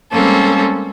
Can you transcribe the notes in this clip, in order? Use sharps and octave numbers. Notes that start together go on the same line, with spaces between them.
G3 G#3 A#3 C4 C#4 A4